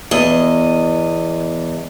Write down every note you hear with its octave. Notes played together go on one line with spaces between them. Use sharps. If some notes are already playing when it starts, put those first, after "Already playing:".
E2 D#5